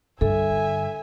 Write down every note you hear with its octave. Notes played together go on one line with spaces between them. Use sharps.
G2 D3 A4 E5 G#5